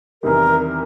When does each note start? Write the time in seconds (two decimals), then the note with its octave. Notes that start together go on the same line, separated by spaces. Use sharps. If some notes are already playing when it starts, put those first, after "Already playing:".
0.23 E2 C3 D#3 G3 A#4